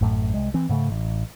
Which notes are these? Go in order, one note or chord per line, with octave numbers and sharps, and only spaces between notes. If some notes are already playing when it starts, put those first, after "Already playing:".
A1 F#2 A2
C2 G#3
E3 C4
G#2 C#3 A3
A1